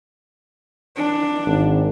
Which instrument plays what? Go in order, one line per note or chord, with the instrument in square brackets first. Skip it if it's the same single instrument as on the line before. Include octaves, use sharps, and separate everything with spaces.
[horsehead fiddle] D4
[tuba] G#1